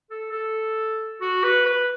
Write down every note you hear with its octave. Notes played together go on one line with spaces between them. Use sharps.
A4
A4
F#4
B4
B4